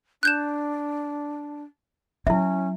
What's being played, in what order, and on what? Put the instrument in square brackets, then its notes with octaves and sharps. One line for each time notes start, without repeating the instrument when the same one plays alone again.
[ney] D4 [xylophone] F#6 G6 E7
[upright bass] F#3 [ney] C#4 [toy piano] E4 E5